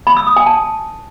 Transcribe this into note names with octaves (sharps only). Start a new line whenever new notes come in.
B5
E6
D#6
G#5
A5